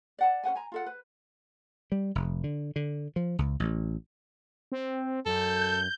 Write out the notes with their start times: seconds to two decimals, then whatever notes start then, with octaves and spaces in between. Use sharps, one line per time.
0.18 D5 F#5 A5
0.43 C#4 C5 F#5 G#5
0.55 G#5 A#5
0.72 F4 A4 F#5
0.86 B4
1.92 G3
2.15 F1
2.44 D3
2.76 D3
3.16 F3
3.39 C#2
3.60 A1
4.72 C4
5.26 F#2 A4 G6